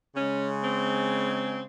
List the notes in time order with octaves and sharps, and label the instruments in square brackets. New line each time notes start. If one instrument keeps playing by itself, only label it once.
[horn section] C#3 G#3 C#4
C4